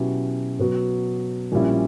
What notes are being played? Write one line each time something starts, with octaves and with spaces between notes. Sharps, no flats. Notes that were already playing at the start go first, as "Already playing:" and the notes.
Already playing: B2 F#3 C#4 E4 G4
B2 F#3 B3 F#4
A#1 A#2 G3 C#4 E4